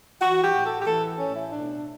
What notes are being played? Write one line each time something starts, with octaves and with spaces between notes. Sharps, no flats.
E3 F#4
G4
A2
A4
G4
E3 A4
A2 C#4
E4
B2 D4